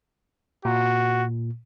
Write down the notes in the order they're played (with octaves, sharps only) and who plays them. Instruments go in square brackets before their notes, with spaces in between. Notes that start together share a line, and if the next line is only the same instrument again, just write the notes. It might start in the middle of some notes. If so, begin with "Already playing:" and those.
[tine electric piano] A#2 [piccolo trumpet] F#4